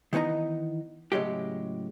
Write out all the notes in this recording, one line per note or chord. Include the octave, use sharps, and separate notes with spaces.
D#3 E3 B3 D#4 A#5
A2 C#3 F#3 G#3 G4